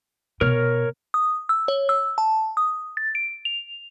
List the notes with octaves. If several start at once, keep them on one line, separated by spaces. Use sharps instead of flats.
B2 A#4 C#5 F6
D#6
E6
C#5
E6
A5
D#6
A6
D7
F7